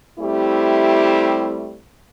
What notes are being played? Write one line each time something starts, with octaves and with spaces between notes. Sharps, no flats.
G3 A3 C4 E4 G4